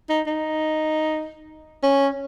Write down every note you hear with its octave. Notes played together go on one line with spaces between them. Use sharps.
D#4
D#4
C#4